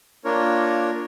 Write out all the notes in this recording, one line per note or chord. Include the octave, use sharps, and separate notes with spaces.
A#3 D4 F4 A#4 C#5